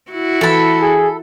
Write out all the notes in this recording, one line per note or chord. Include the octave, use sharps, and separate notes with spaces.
E4 F#4
E3 A4 B5 A6
G#4